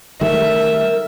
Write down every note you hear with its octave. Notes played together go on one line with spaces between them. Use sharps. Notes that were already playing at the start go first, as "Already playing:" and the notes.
D#3 G3 A3 A#4 E5